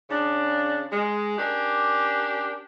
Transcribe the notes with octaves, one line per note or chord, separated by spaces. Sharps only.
C#3 D4
G#3
C#4 D4 G4 A#4